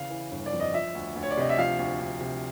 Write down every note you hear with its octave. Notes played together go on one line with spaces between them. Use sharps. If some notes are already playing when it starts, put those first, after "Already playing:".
Already playing: C#3 E3 F5
E3
G1
D5
F2
D#5
F3 E5
D2
D2
C#5
D5
C3 D#5
E5
F3 F5
D2
D2
C3